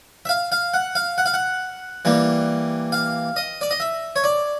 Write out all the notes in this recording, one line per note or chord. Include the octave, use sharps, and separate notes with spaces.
E5
F5
F5
F#5
F5
F#5
F5
F#5
E3 G3 A#3
F5
D#5
D5
D#5
E5
C#5
D5